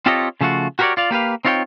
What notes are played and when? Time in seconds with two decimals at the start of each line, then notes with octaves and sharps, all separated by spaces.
0.06 C4 F4 G4 A4 C#5 D#5
0.41 C#3 F3 A3 F4 F#4
0.79 F#4 G4 A#4 B4 C#5 D5
0.97 F4 D5 F5
1.11 A#3 G4 B4 F5
1.45 C4 D#4 F4 C#5 E5 G5